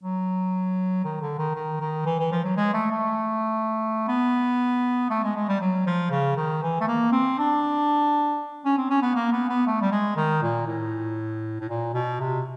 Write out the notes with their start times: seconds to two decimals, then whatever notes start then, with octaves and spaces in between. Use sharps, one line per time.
0.04 F#3
1.05 D#3
1.21 D3
1.39 D#3
1.55 D#3
1.80 D#3
2.06 E3
2.19 E3
2.32 F3
2.44 F#3
2.57 G#3
2.74 A3
2.91 A3
4.08 B3
5.10 A3
5.23 G#3
5.36 G#3
5.49 G3
5.61 F#3
5.87 F3
6.11 C#3
6.37 D#3
6.62 E3
6.81 A3
6.87 A#3
7.12 C4
7.39 D4
8.65 C#4
8.77 C4
8.90 C#4
9.02 B3
9.15 A#3
9.32 B3
9.49 B3
9.67 A3
9.81 G3
9.91 G#3
10.16 D#3
10.42 A#2
10.67 A2
11.61 A2
11.69 A#2
11.94 B2
12.20 C3